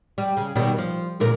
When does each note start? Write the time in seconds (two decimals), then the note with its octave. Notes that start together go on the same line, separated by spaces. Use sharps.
0.18 G3
0.37 C#3
0.56 B2 D#3 G3
0.78 F3
1.20 D2 A#2 A#4